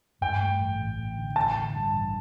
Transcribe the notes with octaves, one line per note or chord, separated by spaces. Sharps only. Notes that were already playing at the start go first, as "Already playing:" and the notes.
G2 G5
A3
A1
A1
A1
D3
A1 A5
D3
G2
A1